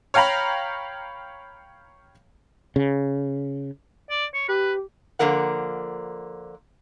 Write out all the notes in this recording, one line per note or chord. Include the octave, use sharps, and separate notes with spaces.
C#5 F5 G5 A#5 B5
C#3
D5
C#5
G4 B4
D3 F3 A#3 A#4 F#5